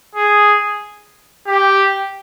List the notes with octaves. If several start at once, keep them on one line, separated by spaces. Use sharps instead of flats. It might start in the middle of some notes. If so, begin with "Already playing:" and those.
G#4
G4